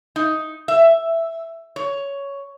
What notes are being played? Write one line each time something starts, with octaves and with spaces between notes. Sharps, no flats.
D#4
E5
C#5